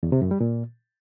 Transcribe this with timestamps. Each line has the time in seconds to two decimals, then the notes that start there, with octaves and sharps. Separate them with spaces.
0.03 E2
0.12 C3
0.22 F#2
0.31 G3
0.40 A#2